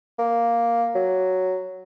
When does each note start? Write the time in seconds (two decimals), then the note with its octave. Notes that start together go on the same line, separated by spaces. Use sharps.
0.19 A#3
0.95 F#3